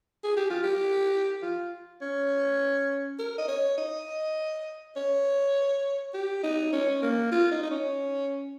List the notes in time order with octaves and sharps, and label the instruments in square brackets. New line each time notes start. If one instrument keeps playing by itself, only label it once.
[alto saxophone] G#4
G4
F4
G4
F4
C#4
A#4
D#5
C#5
D#5
C#5
G4
D#4
C#4
A#3
F4
D#4
D#4
C#4